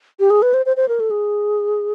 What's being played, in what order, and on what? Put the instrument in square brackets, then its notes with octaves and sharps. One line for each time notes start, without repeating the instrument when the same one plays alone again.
[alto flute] G4
G#4
B4
C5
C5
C5
A#4
A4
G#4